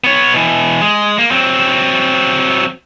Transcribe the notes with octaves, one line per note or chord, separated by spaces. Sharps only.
B3 C#5
B2 E3
G#3
A#3
F#3 C4